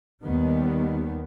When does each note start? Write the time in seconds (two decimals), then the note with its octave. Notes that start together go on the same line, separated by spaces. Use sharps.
0.24 D#2 D#3 G3 B3